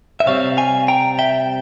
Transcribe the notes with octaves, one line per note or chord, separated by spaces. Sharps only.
E5
C3 G3 C4 C#5 F5
F5 G#5
G5 A#5
E5 G5